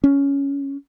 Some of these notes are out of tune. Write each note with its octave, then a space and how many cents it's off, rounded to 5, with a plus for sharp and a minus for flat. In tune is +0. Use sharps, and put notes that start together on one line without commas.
C#4 +10